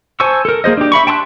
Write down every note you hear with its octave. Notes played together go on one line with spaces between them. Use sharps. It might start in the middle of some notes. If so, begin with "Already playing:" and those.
C5 G#5 A5 C#6 E6
A4 A#4
A#3 G#4 C5 D#5
D4 G4
E5 B5 C#6
G5 A5 C6 D#6 F#6